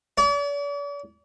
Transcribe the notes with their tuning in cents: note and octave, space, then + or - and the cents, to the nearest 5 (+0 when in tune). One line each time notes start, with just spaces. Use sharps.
D5 -45